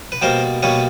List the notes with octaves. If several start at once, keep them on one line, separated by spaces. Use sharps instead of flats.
B4
B2 G3 A#3 A#4 C5
B2 G3 A#3 B4 C#5